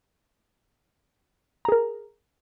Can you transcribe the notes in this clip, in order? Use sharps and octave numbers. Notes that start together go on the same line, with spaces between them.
G#4 A#4 A#5